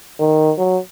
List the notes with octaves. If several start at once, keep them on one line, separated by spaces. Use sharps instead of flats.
D#3
F#3